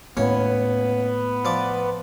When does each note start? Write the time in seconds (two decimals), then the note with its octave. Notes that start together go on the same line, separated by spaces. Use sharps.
0.17 D#2 A2 B3 C#4 C#6
1.45 F3 D5 D6